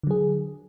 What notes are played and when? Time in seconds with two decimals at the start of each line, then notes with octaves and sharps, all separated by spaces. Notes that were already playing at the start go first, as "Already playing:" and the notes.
0.03 D3
0.07 F#3
0.11 G#4